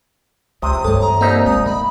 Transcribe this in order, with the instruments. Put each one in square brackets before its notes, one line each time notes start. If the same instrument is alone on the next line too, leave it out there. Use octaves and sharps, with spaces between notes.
[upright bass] C#2 [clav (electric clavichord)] C3 [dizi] D#6
[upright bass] E2 G2 [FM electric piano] A4 C#5
[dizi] A#5
[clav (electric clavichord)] C2 D#4 E5 [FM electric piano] A#3 C4 C5
[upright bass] G#3 [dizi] D#6
[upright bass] D#3 [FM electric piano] A#3 [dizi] B5